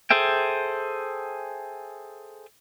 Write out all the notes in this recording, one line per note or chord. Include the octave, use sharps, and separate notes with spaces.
G#4 A4 C5 E5 G5